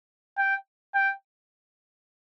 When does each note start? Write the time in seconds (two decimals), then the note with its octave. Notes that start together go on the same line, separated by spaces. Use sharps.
0.38 G5
0.95 G5